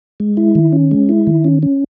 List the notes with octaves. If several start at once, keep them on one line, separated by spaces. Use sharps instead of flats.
G#3
E4
D#3
C#4
G#3
E4
D#3
C#4
C#4